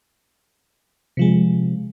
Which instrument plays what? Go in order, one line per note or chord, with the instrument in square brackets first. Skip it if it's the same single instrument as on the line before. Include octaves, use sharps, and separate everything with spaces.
[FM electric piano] C3 F3 G#3